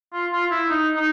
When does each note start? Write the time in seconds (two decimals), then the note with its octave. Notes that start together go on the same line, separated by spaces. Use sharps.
0.13 F4
0.33 F4
0.51 E4
0.69 D#4
0.96 D#4